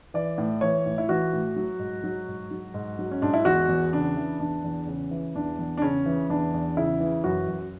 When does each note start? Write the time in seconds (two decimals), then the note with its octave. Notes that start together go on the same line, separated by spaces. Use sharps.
0.14 E3 D5
0.38 A2
0.61 E3 C#5
0.86 A2
0.98 E4
1.09 E3 F#4
1.33 A2
1.56 F#3
1.79 G#2
2.04 F#3
2.28 G#2
2.51 F#3
2.74 G#2
2.99 F#3
3.11 C#4
3.22 G#2 D4
3.34 E4
3.45 E2 F#4
3.69 E2
3.93 C#3 D4
4.17 E3
4.40 E2 D4
4.64 E2
4.87 C#3 C#4
5.11 E3
5.35 E2 D4
5.59 E2
5.77 D4
5.82 C#3 C#4
6.06 E3
6.30 E2 D4
6.54 E2
6.77 C#3 E4
7.00 E3
7.24 F#2 F#4
7.48 F#2